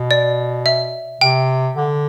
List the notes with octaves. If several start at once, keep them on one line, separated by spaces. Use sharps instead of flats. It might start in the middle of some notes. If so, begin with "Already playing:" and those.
Already playing: B2
D5
E5
C3 G5
D3